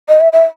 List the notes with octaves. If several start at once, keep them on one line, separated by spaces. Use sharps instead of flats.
D#5
E5
E5